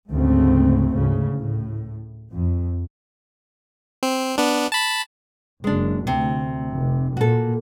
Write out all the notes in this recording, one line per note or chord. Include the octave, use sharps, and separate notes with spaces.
D2 G#2 C#3 A3 C4
D2 G#2 C#3
A2
F2
C4
B3 D4
A5 B5
F#1 G#3 D4
D2 C3
F1
A#2 F#4 A4